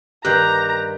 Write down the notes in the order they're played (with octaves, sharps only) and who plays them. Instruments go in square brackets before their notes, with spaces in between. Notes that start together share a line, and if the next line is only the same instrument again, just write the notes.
[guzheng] G2 D#3 [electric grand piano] G4 [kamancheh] A#5 [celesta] F#6 G6